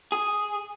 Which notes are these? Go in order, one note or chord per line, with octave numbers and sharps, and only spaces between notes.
G#4